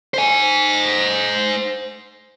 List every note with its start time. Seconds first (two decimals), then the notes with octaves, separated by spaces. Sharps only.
0.14 C5 G#5